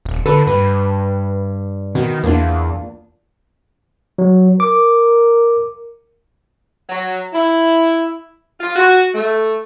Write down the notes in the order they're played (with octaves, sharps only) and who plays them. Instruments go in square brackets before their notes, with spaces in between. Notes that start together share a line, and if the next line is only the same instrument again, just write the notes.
[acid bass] D#1
[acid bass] D3 [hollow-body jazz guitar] A4 B4
[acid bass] G2 [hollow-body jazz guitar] B4
[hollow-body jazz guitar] B2 [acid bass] D#3
[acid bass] E2 [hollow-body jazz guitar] A#3 D4 F4
[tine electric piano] F#3
[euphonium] A#4 [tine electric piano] D6
[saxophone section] F#3
E4
F4
F#4
A3